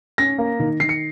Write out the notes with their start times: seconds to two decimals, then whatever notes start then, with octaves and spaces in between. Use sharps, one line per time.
0.18 C#4 A#6
0.38 A#3
0.60 D#3
0.80 D#3 C7
0.89 C#7